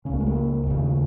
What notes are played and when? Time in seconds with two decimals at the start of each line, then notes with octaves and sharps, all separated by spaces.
0.05 C#3 C#4
0.10 C#2 A#3
0.20 G#3
0.27 A#3
0.67 D#2 C#3